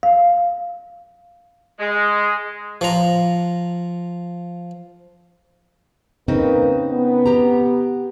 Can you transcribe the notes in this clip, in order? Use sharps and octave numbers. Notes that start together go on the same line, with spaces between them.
F5
G#3
F3 A#5
C#3 A#3 C4 D#4 B4
B3
G4 A#5